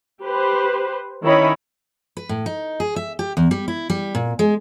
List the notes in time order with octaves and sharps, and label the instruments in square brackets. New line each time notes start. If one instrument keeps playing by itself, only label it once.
[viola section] G4 B4 C5
D#3 C#4 E4 C#5 D#5 B5
[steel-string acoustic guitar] B4
A2
D#4
G#4
E5
G4
E2
G3
E4
G3
A#2
G#3